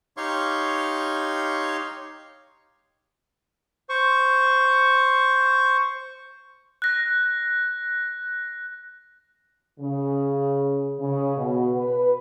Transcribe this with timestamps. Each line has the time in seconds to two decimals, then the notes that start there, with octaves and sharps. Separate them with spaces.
0.17 D#4 G4 C#5 F5 C6 C#6
3.89 C5 C#6
6.82 F#6 A#6
9.80 C#3
10.99 C#3
11.37 B2
11.76 B4